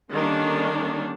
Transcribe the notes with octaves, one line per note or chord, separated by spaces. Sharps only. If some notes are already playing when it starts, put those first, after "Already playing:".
D3 D#3 G3 A#3 C#4 D4